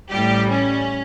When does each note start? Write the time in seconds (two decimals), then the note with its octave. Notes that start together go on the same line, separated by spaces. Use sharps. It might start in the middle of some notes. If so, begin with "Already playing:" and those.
0.11 A1 A2 G3 G4
0.50 C#4